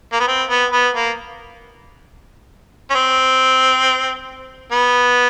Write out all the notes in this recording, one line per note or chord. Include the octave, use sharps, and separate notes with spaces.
A#3
B3
C4
B3
B3
A#3
C#4
C4
B3